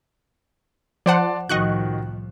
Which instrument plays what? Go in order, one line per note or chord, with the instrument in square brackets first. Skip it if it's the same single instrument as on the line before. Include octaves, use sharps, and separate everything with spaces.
[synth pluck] F3 C5 F#5 [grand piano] D5 A5 C6
[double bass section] C2 A2 F3 [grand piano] D#3 F#4 [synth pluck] D#5 C#6 F#6